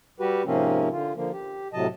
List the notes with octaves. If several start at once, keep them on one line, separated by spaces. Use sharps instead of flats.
G3 F#4 G4 B4
G#2 C3 F3 A#3 C4 C#4
D3 F4
D3 F3 A#3
G4
A2 C3 F#3 D#5 A5